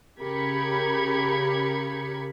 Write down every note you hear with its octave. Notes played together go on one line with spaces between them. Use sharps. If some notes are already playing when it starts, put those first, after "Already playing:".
C#3 G4 A#4 B5 G#6 C#7